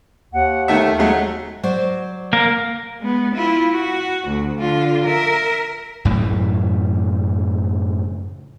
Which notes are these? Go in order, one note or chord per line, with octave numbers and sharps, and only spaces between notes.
D#2 F#5
D#3 A3 E5
F#3 G#3 A3 F#5
F#3 C5 D5
A#3 A#4
G#3 B3
E4 F4
F#4
D2
D3 F4
A#4 E5
F#2 A2 C#3 E3